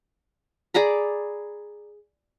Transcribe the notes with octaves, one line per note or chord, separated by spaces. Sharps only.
G#4 D5 A#5 B5